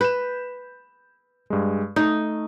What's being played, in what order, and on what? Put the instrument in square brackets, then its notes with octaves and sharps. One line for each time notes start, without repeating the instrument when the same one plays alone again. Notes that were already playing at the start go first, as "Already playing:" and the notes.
[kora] B4 [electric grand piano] G6 E7
[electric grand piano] G2 G#3
[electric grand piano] A3 [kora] D#4